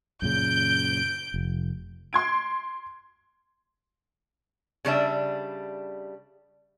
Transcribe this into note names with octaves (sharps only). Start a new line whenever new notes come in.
F#2 A#2 C#3 G6 D7
F1
C6 G#6 D7
C#3 G3 D4 E5